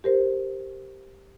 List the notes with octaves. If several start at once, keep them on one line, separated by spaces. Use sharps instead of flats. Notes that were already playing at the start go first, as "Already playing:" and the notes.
G4 A#4 C5